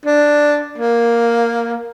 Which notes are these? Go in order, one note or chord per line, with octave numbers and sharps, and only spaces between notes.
D4
A#3